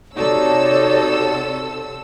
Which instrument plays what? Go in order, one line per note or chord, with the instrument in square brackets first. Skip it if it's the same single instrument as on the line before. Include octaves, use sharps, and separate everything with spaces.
[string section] C3 A4 E6 [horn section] D#4 F#4 [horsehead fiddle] C#5 [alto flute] D5